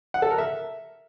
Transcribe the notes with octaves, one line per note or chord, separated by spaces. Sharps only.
F#5
A4
A#4
E5